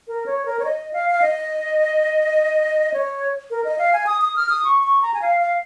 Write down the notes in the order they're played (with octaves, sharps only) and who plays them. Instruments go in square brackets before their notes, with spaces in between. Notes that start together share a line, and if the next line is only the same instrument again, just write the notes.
[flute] A#4
C#5
A#4
C#5
D#5
F5
F5
D#5
C#5
A#4
D#5
F5
G#5
D#6
D#6
F6
D#6
C#6
C#6
A#5
G#5
F5
F5